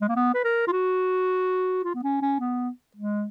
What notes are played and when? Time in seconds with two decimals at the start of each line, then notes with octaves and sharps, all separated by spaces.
0.01 G#3
0.09 A#3
0.16 B3
0.34 B4
0.44 A#4
0.67 F4
0.72 F#4
1.84 F4
1.95 B3
2.04 C#4
2.22 C#4
2.40 B3
2.97 G#3